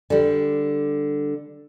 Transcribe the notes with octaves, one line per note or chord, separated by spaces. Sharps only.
D3 G3